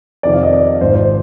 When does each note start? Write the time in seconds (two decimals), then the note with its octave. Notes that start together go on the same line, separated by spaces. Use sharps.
0.23 F2 C3 D#3 D5
0.33 F5
0.43 D#5
0.53 D5
0.81 G#1 G#2 F3 C5
0.95 C5